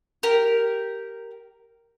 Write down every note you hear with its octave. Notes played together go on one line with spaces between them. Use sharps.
G4 A#4